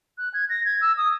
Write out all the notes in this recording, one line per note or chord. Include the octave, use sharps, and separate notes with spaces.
F#6
G#6
A#6
G#6
E6
D#6